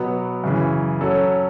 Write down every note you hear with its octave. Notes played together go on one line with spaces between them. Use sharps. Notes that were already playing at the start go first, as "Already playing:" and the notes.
Already playing: B2 F#3 B3
F#2 C#3 E3
F#3 C#4 A4